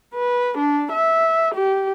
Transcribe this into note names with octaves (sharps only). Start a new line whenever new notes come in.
B4
D4
E5
G4